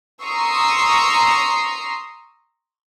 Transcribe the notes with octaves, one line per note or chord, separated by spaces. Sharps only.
A#5 C6 C#6 D#6 E6 C7